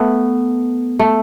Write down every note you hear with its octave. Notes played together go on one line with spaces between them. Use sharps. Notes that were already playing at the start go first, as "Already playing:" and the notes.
Already playing: A3 B3
A3